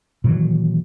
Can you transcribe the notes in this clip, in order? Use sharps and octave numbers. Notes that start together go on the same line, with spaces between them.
A#2 D#3 E3 F#3